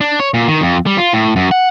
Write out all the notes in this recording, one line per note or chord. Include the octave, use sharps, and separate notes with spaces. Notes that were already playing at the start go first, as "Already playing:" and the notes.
D4
C#5
A#2
D#3
F2
G3
F4
A2
F#2
F#5